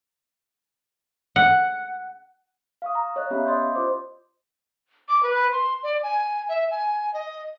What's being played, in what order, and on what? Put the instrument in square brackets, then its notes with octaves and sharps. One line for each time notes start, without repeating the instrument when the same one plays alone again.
[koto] F#5
[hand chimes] F5 C#6 D#6
A#5
C#5 D#5 F#6
B3 C#4 G4 E5 F5 B5
D5 D#5 C6 G6
F4 C5 D6
[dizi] D6
B4
C6
D5
G#5
E5
G#5
D#5